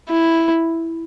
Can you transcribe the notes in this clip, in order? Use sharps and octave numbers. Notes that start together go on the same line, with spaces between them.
E4